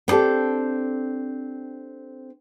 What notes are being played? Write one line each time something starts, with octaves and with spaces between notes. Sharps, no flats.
B3 C4 D4 G4 A4